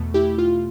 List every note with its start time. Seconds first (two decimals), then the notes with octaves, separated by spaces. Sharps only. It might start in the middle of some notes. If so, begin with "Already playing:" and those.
Already playing: E2 B2 A3
0.14 E4 G4
0.38 F4